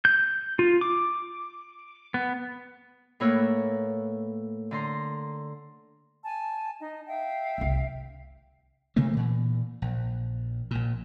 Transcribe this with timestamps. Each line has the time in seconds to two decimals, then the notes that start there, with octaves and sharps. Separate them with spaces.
0.05 G6
0.59 F4
0.81 D6
2.14 B3
3.20 A2 A#3 A#4 B4 C#5 E6
4.71 D3 A#5 C6
6.23 G#5 A5
6.80 D#4 D#5
7.07 E5 F5 G5
7.58 F#1 C2
8.96 C3 D#3 A3 A#3
9.14 A#2 E3
9.82 A#1
10.71 A#1 A#2